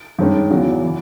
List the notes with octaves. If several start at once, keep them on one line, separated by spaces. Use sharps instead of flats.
G2 D#3 G#3 C#4
E2 C#3 F#3
E3